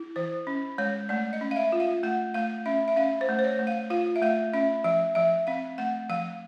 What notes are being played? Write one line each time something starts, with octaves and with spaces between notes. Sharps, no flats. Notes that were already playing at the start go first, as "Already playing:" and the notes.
Already playing: E4
E3 C5
C#4
G#3 C#5
A3 D5
D#5
C#4
F5
E5
F4
F5
A3 F#5
A3 F5
C#4 E5
E5
C#4 F5
C5
A3
C5
C#5
A3
F5
F4 F5
E5
A3 F5
C#4 E5
F3 E5
F3 E5
C4 F5
A3 F#5
F3 F5